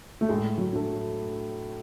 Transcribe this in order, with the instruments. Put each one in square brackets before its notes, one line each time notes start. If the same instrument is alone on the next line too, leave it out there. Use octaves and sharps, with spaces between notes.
[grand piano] A3
[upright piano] A2 [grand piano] G#3
[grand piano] F#3
[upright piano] F#3 A3